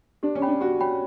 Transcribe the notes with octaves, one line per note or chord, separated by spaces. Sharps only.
D4 G4
C#4
C#5 G5 B5
D4
F#4 G4
C#5 G5 B5